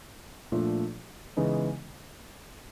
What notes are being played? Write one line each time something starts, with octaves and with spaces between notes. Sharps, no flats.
A#2 F3 A3 D4 F4
C#3 E3 G#3 B3 D#4